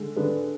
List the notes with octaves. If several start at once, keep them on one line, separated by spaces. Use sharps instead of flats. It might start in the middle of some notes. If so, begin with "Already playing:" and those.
Already playing: D3 G#3
D3 G#3 D4 B4